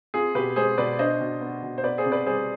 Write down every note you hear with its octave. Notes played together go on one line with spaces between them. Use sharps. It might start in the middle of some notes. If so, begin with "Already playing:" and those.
C4 F4 G#4
B2 G4 B4
G#3 G#4 C5
B2 B4 D5
D4 C5 D#5
B2
B3
B2
C5
B3 B4 D5
G#4 C5
C3
B4 D5
G3 G#4 C5